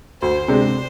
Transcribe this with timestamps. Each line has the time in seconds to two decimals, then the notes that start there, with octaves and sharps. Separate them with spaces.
0.21 D2 C5
0.48 C3 G#3 D4